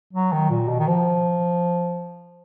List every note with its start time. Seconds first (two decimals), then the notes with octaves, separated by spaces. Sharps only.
0.13 F#3
0.32 D#3
0.50 A#2
0.68 B2
0.79 D#3
0.87 F3